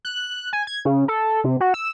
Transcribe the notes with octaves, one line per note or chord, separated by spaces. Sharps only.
F#6
G#5
G#6
C#3
A4
C3
F#4
E6